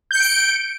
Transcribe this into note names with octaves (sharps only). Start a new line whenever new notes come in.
G6 C#7 D7